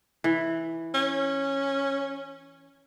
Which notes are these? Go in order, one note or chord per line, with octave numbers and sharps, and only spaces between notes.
E3
C#4